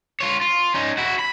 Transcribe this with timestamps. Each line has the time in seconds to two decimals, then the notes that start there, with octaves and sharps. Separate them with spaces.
0.20 F4 C#5
0.41 F4
0.74 C#4 D#4
0.98 E4 F#4
1.19 B5